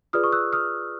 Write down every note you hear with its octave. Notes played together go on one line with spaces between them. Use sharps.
F4 G#4 B4 D5 D#6 F6
C#6 D#6
E6 F#6
D#6 F6